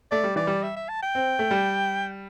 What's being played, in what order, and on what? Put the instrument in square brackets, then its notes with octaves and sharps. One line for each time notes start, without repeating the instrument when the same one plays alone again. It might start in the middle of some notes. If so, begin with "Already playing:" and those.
[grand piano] A3 [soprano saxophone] D5
[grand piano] G3
[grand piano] E3 [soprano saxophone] D5
[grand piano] G3
[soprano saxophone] E5
E5
A5
G5
[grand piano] C4
A3
G3